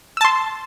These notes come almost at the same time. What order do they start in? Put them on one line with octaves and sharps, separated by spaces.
E6 A5 C6